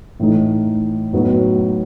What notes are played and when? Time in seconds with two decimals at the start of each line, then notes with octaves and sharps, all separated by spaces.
0.20 A2 E3 A3 D#4
1.13 A2 F#3 B3 D#4 F#4